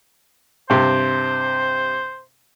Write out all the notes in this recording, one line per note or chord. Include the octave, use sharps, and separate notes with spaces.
G2 C3 C5